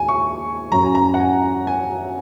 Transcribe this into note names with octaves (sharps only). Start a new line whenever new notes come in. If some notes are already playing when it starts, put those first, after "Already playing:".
Already playing: D#2 D#3 G#3 G#5
C#6
F#2 F#3 A#5
G#5
A#5
F#5
G#5
G#5